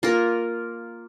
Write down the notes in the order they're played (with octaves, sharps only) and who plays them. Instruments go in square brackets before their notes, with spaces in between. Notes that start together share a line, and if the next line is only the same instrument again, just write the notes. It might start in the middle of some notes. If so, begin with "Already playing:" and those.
[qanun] A#3 F4 A#4